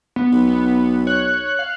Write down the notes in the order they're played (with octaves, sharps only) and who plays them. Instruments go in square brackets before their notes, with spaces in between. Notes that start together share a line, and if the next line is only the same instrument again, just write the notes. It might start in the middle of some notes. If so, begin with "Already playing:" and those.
[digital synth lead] B3
[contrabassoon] B1
[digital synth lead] B3
[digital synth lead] C#5 [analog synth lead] F#6
[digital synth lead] F5